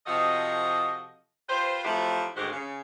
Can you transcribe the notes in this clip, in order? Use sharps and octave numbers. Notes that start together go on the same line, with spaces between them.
C3 F3 F#4 A4 D#5
F4 G4 B4 C5
F3 F#3 A3 C4 E4 G4
D2 G#2 D#3 F#4 G4 C5
C#3